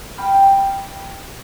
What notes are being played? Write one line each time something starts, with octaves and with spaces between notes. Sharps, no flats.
G5 B5 D6 F6